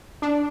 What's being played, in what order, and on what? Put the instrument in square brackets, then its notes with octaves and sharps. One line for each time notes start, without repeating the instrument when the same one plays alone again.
[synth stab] D4